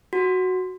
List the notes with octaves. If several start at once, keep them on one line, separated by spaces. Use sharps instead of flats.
F#4